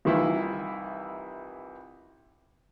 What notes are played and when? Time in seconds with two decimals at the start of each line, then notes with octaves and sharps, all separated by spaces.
0.05 C2 D#3 E3 E4 F4 E5